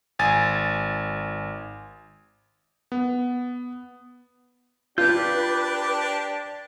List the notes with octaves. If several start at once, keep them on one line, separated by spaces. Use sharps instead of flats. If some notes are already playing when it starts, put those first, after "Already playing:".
G#1 G#5 A6
B3
D4 F4 G4 B4 G6